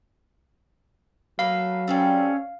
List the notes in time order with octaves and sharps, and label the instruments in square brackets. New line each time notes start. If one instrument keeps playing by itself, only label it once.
[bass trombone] F#3 [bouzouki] A3 A#3 B4 [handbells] F5
[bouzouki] G3 C4 A4 [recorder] C#4